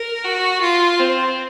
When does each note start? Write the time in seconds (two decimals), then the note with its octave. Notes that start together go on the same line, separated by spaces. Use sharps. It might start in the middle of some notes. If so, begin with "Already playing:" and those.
Already playing: A#4
0.24 F#4
0.61 F4
1.00 C4